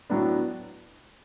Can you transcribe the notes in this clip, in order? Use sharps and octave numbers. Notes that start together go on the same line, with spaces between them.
A2 F#3 B3 D4